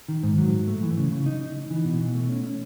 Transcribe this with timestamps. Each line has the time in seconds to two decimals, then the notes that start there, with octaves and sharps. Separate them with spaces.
0.08 D#3
0.23 G#2
0.38 F#3
0.53 G#2
0.67 A3
0.82 E3
0.97 C#3
1.11 C#3
1.26 D#4
1.41 D#4
1.56 D#4
1.71 E3
1.85 B2
2.00 B2
2.15 A3
2.29 C#4
2.44 C#4